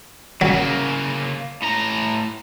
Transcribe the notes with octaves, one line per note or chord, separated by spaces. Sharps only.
C#3 F#3 A#3
A2 A#5